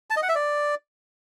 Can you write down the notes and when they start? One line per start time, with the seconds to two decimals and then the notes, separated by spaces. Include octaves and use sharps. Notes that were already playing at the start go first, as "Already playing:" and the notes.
0.10 A5
0.16 D#5
0.23 F#5
0.29 E5
0.35 D5